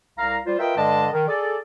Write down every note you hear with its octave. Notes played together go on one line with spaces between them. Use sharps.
C2 F5 A#5
G3 F4 C5
F4 A#4 B4 D#5 E5 G5
G2 D3 G#3 D5 D#5 A5
D#3
G#4 A4 D5